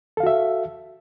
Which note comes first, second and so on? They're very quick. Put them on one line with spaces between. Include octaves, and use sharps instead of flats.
A4 F5 F#4 E5